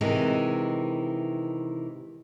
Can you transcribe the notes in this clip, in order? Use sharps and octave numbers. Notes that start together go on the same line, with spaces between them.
C3 D#3 E3 G#3